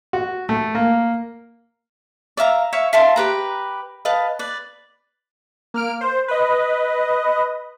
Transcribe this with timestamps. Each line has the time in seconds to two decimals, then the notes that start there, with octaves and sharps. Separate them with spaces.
0.13 F#4
0.49 A3
0.75 A#3
2.37 D5 E5 F5 A#5
2.73 C#5 E5 F5 C#6
2.93 E5 F5 A5 C6
3.16 G4 B4 A#5
4.05 B4 D#5 F5 A5
4.39 B4 D5
5.74 A#3 F6 D7
6.01 C5
6.28 B4 D#5